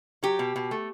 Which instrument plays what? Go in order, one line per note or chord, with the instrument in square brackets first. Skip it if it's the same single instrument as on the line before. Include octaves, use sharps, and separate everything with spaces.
[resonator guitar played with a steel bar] F#3 G4
B2
B2
A3